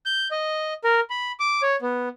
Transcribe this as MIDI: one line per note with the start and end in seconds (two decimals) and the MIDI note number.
0.06 0.28 91
0.31 0.73 75
0.84 1.00 70
1.10 1.32 83
1.40 1.62 86
1.62 1.76 73
1.82 2.09 59